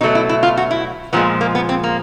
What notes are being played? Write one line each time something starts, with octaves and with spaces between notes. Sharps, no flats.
B2 F#3 A3 D#4
E4
E4
F4
F#4
E4
A#2 F3 G#3 B3
A#3
B3
C4
A#3